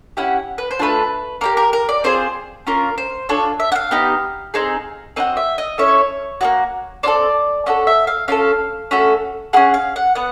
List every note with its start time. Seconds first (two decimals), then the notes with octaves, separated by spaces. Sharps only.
0.17 C#4 E4 G4 F#5
0.58 B4
0.71 C5
0.79 A3 D4 F4 B4
1.41 A#3 D#4 G4 A#4
1.57 A#4
1.73 A#4
1.89 D5
2.04 C4 F4 G#4 C5
2.67 A#3 C#4 F4 A#4
2.98 C5
3.29 D4 F4 A4 C#5
3.60 E5
3.72 F#5
3.75 F5
3.91 B3 D#4 G4
4.54 C4 D#4 G#4
5.16 C4 D#4 F#4 D#5
5.37 E5
5.58 D#5
5.78 C#4 E4 A4 C#5
6.41 A#3 D#4 F#4
7.03 C4 F4 A4 D5
7.66 C#4 F#4 A4 D#5
7.87 E5
8.07 F5
8.28 C#4 F4 A4 F5
8.91 A3 C#4 F#4 A4
9.53 C#4 E4 G#4 F#5
9.74 F5
9.96 F#5
10.15 B3 F#5